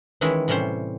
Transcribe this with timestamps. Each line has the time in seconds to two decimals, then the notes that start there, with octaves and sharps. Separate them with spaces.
0.21 D#3 E3 G#3 C#4 E4
0.48 A2 C3 G3 C#4 C5